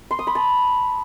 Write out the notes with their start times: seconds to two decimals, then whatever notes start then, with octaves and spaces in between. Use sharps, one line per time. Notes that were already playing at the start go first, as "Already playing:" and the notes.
0.11 C6
0.19 D#6
0.27 B5
0.35 A5